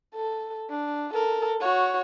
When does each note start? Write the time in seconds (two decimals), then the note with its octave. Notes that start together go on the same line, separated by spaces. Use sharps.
0.15 A4
0.70 D4
1.14 A4 A#4
1.60 F#4 C#5